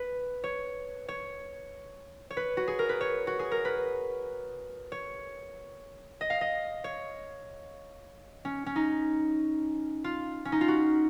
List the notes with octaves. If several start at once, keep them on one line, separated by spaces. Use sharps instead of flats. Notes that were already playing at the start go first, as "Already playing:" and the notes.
Already playing: B4
C#5
C#5
C#5
B4
F#4
G#4
A#4
B4
C#5
F#4
G#4
A#4
B4
C#5
D#5
F5
D#5
C#5
C#4
C#4
D#4
F4
C#4
D#4
F4
F#4